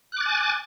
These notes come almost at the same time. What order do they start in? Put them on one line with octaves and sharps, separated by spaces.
F#6 D6 A6 G#5